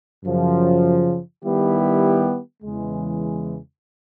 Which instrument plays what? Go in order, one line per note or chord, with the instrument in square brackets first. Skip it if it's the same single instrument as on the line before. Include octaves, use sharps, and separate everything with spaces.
[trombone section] F#2 C#3 F3
D#3 G3 B3 E4 G4
E2 C#3 E3 G#3